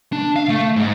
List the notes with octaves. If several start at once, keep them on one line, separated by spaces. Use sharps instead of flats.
D4
F5
A3
G#2